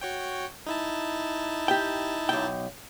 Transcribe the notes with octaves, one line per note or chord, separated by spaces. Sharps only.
F#4 C#5 G5
D#4 E4 A5
G4 G5
B1 G5